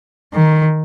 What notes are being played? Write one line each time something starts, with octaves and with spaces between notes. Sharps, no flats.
D#3